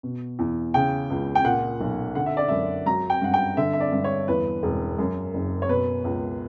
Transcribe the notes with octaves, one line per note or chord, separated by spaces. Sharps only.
B2
E2
C#3 G5
C#2
G5
A#2 F#5
B1
D3 F#5
E5
D5
F#2 E5
F#3 A#5
G5
G2 F#5
G5
D3 E5
E5
D5
G2
C#5
E2 B4
E1
F#2
F#1
C#5
B2 B4
C#2